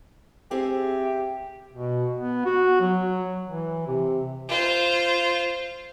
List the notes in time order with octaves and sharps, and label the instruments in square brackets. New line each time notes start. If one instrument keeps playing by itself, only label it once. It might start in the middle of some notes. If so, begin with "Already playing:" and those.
[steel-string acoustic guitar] C4 G#4 E5 [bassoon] G4
[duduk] B2
B3
F#4
F#3
E3
C3
[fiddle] F4 C5